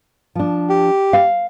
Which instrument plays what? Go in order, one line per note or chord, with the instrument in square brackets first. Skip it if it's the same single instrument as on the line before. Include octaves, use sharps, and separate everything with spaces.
[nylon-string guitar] F3 D4
[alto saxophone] G4
[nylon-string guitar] F5